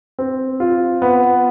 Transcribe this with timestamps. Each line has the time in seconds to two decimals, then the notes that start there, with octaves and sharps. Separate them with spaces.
0.19 C4
0.60 F4
1.02 B3